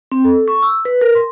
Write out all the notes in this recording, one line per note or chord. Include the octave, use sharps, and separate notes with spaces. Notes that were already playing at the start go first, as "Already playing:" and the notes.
C4
A4
C#6
E6
B4
A#4
C6